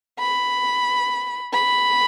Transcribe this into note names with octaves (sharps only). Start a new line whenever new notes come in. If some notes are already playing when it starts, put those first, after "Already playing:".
B5
B5